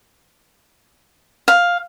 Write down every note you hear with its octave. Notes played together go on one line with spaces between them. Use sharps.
F5